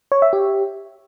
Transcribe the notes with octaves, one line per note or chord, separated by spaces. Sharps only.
C#5
E5
G4